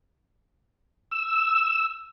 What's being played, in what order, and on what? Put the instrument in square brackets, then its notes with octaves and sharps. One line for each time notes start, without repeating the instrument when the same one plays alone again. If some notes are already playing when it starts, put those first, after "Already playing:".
[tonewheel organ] E6